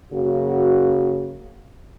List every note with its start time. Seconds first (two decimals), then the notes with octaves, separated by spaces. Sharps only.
0.13 F#2 C#3 A#3 F#4